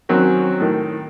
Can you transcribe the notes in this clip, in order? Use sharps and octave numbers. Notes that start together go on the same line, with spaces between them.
D#3 F#3 C4 C#4
A2 D#3